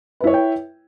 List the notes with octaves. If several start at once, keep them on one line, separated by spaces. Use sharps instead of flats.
E4 B4 C#5 E5 G5